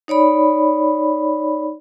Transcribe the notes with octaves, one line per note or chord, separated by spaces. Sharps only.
D#4 C#5 D5 B5